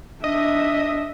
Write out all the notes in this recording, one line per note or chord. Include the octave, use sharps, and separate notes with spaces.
D4 D#5 E5